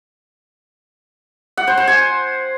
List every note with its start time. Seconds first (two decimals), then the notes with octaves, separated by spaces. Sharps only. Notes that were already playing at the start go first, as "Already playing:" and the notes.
1.57 F#5
1.67 C5
1.77 C5
1.88 G#5